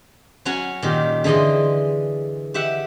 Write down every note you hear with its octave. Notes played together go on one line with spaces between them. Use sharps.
F#3 C#4 F#4 C#5 F#5 G#5
A#2 D#3 G4
D3 E3 G#4 D#5 C6
G4 E5 F#5